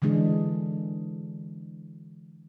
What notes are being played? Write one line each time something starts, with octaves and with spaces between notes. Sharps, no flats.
D3 E3 G#3 D4 G#4